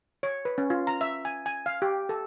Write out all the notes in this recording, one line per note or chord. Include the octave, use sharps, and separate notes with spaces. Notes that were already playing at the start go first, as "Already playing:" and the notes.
C#5
B4
C#4
F4
A#5
E5
G#5
G#5
F5
G4
A4